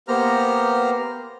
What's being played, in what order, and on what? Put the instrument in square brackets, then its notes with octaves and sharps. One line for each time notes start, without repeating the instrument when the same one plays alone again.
[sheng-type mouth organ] A#3 B3 G4 C5 A#5 F6